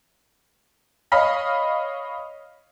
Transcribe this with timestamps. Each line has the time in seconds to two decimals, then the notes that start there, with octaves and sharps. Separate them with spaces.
1.12 C#5 D#5 F5 B5 F6 B6